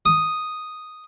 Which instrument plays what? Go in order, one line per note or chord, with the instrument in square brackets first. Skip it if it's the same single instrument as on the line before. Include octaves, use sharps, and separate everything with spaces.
[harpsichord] D#6